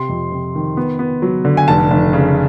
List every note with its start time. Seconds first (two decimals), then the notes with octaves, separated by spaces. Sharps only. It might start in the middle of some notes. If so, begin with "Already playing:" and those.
Already playing: C3 C6
0.09 F2
0.32 C3
0.55 D#3
0.77 B3
0.99 B3
1.22 F#3
1.45 D3
1.57 G#5
1.68 F1 A5
1.90 F1
2.13 C#3